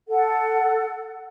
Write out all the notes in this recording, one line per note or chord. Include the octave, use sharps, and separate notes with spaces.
A4 F#5